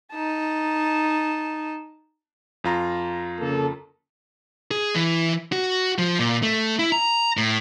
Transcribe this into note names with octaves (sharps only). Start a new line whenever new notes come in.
D#4 A5
F2 F4 A#5
C#3 A#3 A4
G#4
E3
F#4
F3
A#2
A3
E4
A#5
A2